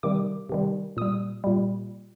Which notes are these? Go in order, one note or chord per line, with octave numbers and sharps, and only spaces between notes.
C3 D#3 G3 D6
C3 D#3 G3
A#2 G3 D#6
A#2 G3